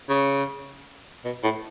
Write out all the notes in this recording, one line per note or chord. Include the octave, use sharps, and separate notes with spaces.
C#3
B2
A2